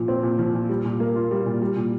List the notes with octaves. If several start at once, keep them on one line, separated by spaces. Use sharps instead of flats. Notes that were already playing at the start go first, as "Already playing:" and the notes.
Already playing: A#2 F3
C4
A#2
F3
A#2
G3
A#2
A#3
F4
G3
A#2
G3
A#2